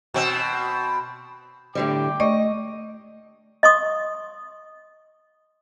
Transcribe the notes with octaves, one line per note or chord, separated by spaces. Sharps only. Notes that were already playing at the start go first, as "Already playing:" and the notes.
B2 C4
A2 D3 G3 G5 D6
A3 D5 D#5 C#6
D#5 C6 C#6 D#6